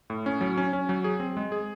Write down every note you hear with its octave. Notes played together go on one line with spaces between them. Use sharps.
A2
C#4
F#3
C#4
C#4
F#3
G#4
C4
G#3
G#4